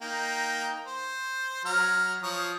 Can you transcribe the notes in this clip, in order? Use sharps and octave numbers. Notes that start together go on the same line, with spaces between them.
A#3 D#4 G5
C5
F#3 A#5 F6
F3 C#5 D#6